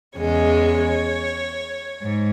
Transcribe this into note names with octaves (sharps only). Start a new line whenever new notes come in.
E2 C#3 G#3 C#5
G#2